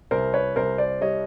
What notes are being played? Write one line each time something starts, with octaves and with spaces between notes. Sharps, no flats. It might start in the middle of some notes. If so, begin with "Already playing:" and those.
C2 A#4 C5
B4 C#5
C2 A#4 C5
C5 D5
G3 C#5 D#5